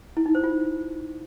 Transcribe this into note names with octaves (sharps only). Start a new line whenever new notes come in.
E4
D#4
C5
F4